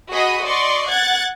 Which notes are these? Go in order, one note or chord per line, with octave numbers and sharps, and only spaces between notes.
F#4 G#4 D#5 B5 D#6
D5 D#5 C6 C#6
F#5 F#6 G#6 A6